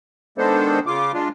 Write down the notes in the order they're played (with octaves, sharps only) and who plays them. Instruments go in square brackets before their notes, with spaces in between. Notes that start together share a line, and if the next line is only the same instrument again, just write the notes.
[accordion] D#3 G#3 B3 D4 A4 C5
C#3 F4 D6
G#3 D4 F4